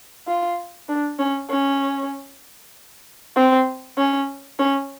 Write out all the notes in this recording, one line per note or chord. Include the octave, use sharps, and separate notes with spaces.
F4
D4
C#4
C#4
C4
C#4
C#4